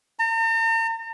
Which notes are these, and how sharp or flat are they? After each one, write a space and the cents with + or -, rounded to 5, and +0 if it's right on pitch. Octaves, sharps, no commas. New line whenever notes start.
A#5 -45